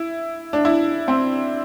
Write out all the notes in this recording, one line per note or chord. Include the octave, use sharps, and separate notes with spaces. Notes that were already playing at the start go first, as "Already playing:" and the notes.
Already playing: E4
D4
E4
C4